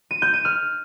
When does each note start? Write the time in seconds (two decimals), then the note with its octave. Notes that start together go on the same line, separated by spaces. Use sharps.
0.11 D#7
0.22 G6
0.34 D#7
0.45 F6